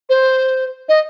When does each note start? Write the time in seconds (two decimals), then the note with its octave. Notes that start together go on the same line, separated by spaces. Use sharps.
0.09 C5
0.89 D#5